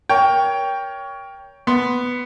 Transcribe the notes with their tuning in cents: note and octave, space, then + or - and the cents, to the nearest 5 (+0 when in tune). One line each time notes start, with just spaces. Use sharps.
A#4 +15 C#5 +20 G5 +5
B3 +5 C6 +0